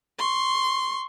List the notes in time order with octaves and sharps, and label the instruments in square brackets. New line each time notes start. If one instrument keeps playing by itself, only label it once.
[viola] C6 C#6